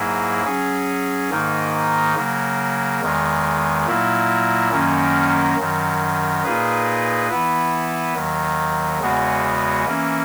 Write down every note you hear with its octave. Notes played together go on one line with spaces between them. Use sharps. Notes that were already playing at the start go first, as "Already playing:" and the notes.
Already playing: G#2 F#3 A#3 E4 G#4
F#3 C#4 G#4
G#2 D#3 A#3 D#4
C#3 F#3 A#3
E2 D#3 G#3
A#2 F#3 A#3 E4
F#2 D#3 F#3 A#3 C#4
F#2 D#3 F#3
A#2 A#3 D#4 G#4 B4
E3 B3 E4 B4
D#2 D#3 F#3
E2 C#3 G#3 B3 F#4
E3 A#3 C#4